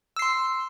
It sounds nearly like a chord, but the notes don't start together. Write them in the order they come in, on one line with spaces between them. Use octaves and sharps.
E6 C7 C6